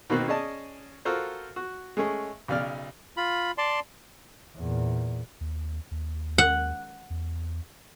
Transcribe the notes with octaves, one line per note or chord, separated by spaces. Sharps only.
B2 D#3 A#3 C4 F#4 F#6
C#4 G#4 D5 D#5 A5
F4 F#4 A4 A#4 C5
F#4
G#3 A3 C#4 G#4
B1 C#3 D5 F6
F4 B5
D5 A5 C6
E2 A#2
D#2
D#2
F#5
E2